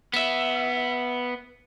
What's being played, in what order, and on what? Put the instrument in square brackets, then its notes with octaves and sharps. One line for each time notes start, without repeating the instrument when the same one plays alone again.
[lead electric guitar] B3 E5